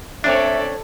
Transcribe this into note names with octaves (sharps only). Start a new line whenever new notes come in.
A3 C4 D4 A4 C#5 D5 E5